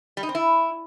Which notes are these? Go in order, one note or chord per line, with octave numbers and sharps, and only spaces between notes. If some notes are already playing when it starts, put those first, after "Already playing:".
G3
D#4
C4
E4